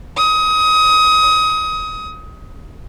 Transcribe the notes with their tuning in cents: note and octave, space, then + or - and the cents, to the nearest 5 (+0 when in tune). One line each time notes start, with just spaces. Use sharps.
D#6 +25